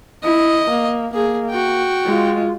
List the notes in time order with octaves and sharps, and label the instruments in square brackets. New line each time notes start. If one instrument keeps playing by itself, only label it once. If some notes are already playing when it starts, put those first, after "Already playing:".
[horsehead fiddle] E4 [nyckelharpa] D#5
[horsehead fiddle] A#3
[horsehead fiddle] A#3 [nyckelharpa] G#4
[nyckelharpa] F#4 G5
[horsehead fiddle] G#3 F4